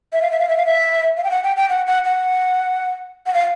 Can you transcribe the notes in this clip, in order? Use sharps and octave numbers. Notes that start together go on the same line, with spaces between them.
E5
F5
E5
F5
E5
F5
E5
F5
G5
F#5
G5
G5
F#5
F#5
F#5
F#5
F5